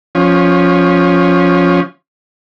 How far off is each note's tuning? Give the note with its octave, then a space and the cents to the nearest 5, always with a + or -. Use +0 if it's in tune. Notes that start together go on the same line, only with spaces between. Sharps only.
F3 +15 C#4 +0